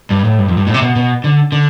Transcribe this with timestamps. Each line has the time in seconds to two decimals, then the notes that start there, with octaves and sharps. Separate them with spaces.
0.11 G2
0.25 A2
0.38 G2
0.49 F2
0.57 G2
0.67 A2
0.74 C3
0.82 B2
0.96 B2
1.24 D3
1.52 D3